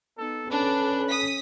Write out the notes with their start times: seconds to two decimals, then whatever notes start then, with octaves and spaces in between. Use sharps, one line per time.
0.18 B3 D#4 A4
0.50 C#4 D4 A4 B4
1.08 D#6 B6